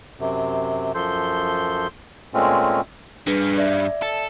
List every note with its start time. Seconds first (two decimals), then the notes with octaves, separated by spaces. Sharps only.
0.20 F#2 C3
0.95 F#2 F3 A4 C6 G6
2.34 A#2 G#3 A3 C4 C#4
3.27 G2 D4 G#4 B4
3.58 D5 E5
4.02 A4